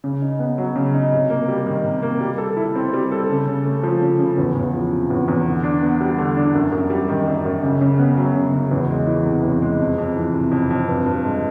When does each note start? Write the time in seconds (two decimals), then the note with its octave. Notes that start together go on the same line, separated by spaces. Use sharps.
0.04 C#3
0.22 D#4
0.39 B3
0.58 F#3
0.76 C#3
0.94 D#4
1.13 C3
1.30 A#3
1.48 G3
1.66 D#3
1.84 C3
2.02 A#3
2.21 G3
2.38 A4
2.57 E4
2.75 C4
2.93 G3
3.12 A4
3.29 C#3
3.48 C#3
3.65 A3
3.83 F3
4.02 C#3
4.19 C#3
4.38 E2
4.55 E2
4.73 F3
4.92 C3
5.10 E2
5.28 E2
5.46 D3
5.63 D4
5.82 B3
6.01 G3
6.18 D3
6.37 D4
6.54 F#2
6.72 F#2
6.90 G3
7.09 D#3
7.27 F#2
7.45 F#2
7.62 C#3
7.81 C#3
7.99 B3
8.17 F#3
8.36 C#3
8.54 C#3
8.71 E2
8.89 G#3
9.07 E3
9.25 C3
9.43 E2
9.62 G#3
9.79 F2
9.98 F2
10.16 E3
10.34 C3
10.51 F2
10.70 F2
10.88 G2
11.06 G2
11.24 G#3